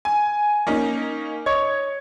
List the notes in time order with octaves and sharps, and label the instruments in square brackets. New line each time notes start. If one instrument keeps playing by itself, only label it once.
[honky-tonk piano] G#5
A#3 C#4 D#4
[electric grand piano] C#5 D#5 C#6 [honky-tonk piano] G#6